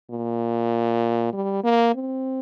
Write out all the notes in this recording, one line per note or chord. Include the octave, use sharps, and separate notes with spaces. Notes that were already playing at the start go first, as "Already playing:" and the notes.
A#2
G3
A#3
C4